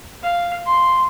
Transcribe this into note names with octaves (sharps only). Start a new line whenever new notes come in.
F5
C6